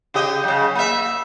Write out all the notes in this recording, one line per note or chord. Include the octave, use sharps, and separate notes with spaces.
C#3 G4 D#5
F#2 C#3
A#3 E5